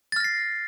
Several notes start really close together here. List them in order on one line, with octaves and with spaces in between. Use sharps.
A6 F6 A#6 C7